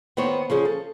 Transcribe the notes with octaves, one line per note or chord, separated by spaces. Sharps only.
D#3 B3 C5 C#5
C#3 F3 C#4 G#4
A4